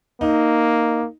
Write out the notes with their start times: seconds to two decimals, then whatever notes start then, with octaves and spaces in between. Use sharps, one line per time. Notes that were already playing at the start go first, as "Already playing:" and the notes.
0.21 A#3 D#4